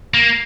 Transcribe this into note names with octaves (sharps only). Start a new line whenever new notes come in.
A#3